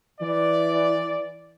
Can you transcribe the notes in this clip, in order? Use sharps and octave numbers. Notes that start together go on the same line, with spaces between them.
E3 D5